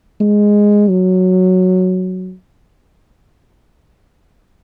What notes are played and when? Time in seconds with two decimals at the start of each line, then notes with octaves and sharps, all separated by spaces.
0.20 G#3
0.89 F#3